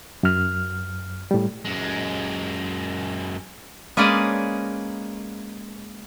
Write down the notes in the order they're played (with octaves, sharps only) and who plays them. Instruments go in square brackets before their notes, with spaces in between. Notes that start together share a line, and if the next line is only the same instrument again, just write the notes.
[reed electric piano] F#2 F6
A2 G3
[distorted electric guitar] F#2 G#3
[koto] G#3 A#3 C#4 B4 D5 D#5